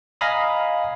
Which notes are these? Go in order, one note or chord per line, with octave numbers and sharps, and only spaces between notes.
D#5 F5 G#5 A#5 B5 D#6